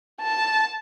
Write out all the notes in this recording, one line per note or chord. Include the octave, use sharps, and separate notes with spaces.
A5